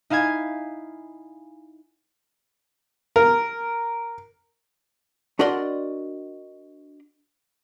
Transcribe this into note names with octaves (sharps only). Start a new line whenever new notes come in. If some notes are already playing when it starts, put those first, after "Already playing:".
D#4 E4 F5 G#5 G#6
A#4
D4 F#4 A#4 D5 D#5 C6